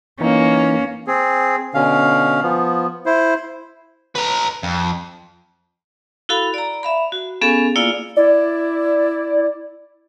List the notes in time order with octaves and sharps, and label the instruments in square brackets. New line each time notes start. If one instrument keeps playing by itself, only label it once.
[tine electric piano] E3 D#4 [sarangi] A#3 [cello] C#4
[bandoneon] C4 G#4
B2 D3 C#4 F5
F3 B3
E4 C5
[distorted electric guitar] B4 A#5
F2
[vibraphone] E4 F#4 A4 F5 B5
D5 A#5
E5 F5 B5
F#4
B3 C#4 G#4 A4 F5 G#5
A#3 E4 F4 D5 F5
[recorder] E4 [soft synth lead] D5